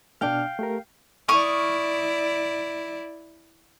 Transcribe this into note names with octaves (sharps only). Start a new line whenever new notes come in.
B2 D4 F5 G5 F6
A3 G4 A#4
E4 D5 C#6 D#6 F6